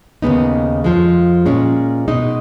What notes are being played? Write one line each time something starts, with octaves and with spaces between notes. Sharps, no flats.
D#2 C#3 G#3 B3 D#4
F2 F3 G#3
A#2 G#3 C#4
B2 G#3 D#4